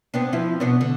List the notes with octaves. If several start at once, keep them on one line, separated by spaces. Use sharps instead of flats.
B3 C4 D4
F3 E4
B2 B3 D4
D3